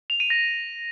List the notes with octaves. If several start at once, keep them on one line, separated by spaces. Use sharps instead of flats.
F7
D#7
A#6